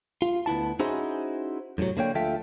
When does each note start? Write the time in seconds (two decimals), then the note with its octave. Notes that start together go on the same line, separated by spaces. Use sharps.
0.22 F4
0.46 D2 B3 E4 A5
0.80 C#4 D#4 E4 F#4 G#4 C5
1.78 F#2 A2 C3 F#3
1.97 D3 A#3 C#5 G5
2.15 D2 F3 F4 A4 E5 G5